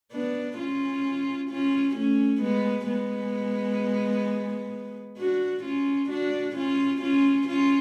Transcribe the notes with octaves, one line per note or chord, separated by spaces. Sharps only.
B3 D4
C#4 F4
C#4 F4
A3 C#4
G#3 B3
G#3 B3
D4 F#4
C#4 F4
D4 F#4
C#4 F4
C#4 F4
C#4 F4